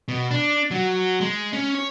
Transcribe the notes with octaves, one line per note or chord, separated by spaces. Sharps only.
B2
D4
F#3
G#3
C#4
C#5